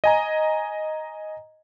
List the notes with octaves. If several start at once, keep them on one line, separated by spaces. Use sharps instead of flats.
D#5 G#5 A#5